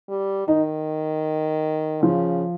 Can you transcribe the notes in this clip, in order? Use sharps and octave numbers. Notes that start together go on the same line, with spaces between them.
G3
D#3 D#4
C#3 F3